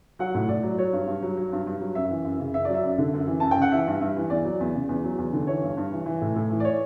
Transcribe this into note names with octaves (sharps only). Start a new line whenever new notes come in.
F#3 F#5
A2
A2 D5
F#3
F#3 C#5
G2
G2
F#3
F#3
G2
G2
F#3
F#2 E5
E3
F#2
C#3
F#2 E5
F#3 D5
E5
F#2
D3
F#2
E3
F#2 A5
G5
C#3 F#5
E3 E5
G2
G2 E5
E3
E2 D5
F#3
E2
C#3
E2
F#3
E2
D3
E3 C#5
G2
G2
E3
E3
A2
A2
E3
D5
C#5